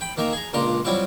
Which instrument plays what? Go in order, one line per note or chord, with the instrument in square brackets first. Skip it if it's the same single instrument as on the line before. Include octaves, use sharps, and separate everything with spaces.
[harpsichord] G5 B5
D#3 A#3 E5 A#5
G#4 A#5
C#2 A#2 D4 A#5 C6
F#3 G3 C4 E4 F4